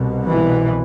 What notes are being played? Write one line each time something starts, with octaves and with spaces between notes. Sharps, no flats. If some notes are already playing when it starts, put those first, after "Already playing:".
Already playing: C2 B2
E3